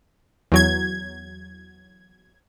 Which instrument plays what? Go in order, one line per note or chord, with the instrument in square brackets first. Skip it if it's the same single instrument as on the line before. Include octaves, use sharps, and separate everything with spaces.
[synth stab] E2 F#3 G#6